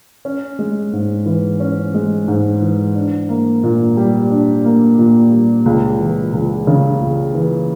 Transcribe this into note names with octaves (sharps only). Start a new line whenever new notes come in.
C#4
G#3
G#2
E3
C#4
G#3
G#2
E3
D4
A#3
A#2
G3
D4
A#3
A#2
G3
C#2
E3
C#2
C#3
C#2
E3